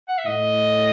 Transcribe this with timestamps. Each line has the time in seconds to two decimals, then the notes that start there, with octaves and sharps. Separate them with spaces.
0.09 F#5
0.18 E5
0.26 A2 D#5